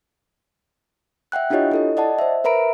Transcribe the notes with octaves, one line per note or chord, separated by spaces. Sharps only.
E5 F#5 G5 F#6
D4 E4 F4 G4 C#5 D#5
E4 A4 D#5
D5 D#5 F#5 A5
C5 E5
A#4 B4 E5 A#5 B5 D7